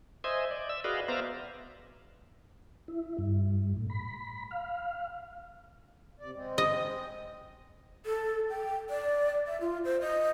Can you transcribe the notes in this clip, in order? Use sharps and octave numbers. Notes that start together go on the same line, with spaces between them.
C5 D#5 E5 G#5
D5
E5 E6
F#4 G#4 B4 D5 D#5 F5
B3 C5 D5 E5 F5 A#5
E4
G2
A2
B5
F5
C3 D5
G#3 C4
D#5
A4
G5
D5
E5
F4
C5
D#5